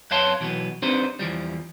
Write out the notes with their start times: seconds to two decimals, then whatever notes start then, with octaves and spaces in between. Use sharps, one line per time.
0.11 F#2 B4 C#5 F5 A5 C6
0.40 B2 E3 F#3 B3
0.82 C4 D4 D#4 G4 B4 C5
1.19 E2 E3 F3 G3